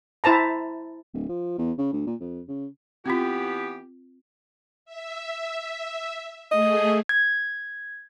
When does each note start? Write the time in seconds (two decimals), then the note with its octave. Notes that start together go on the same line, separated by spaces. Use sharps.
0.24 E4 C5 A5 A#5
1.14 D1
1.29 F3
1.58 E2
1.78 C#3
1.92 D2
2.07 A#2
2.20 F2
2.48 C#3
3.06 E3 B3 C4 F4 G4
4.85 E5
6.51 A3 G#4 D#5
7.09 G#6